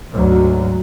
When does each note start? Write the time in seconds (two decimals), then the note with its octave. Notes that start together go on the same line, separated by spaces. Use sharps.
0.14 D2 G#2 F#3